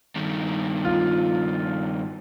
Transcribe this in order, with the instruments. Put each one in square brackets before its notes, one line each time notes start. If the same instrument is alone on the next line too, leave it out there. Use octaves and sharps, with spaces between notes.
[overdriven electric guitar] G2 D#3
[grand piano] F4